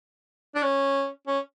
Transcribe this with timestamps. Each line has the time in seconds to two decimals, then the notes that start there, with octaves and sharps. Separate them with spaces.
0.55 D4
0.63 C#4
1.27 C#4